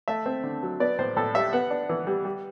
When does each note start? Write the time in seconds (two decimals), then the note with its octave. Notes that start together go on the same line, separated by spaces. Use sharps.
0.08 A3 E5
0.26 C4
0.44 D3
0.63 F#3
0.80 B3 D5
0.99 A2 C5
1.16 A2 A4
1.34 G3 E5
1.53 B3 F#5
1.70 D4
1.89 E3
2.07 G3
2.25 G3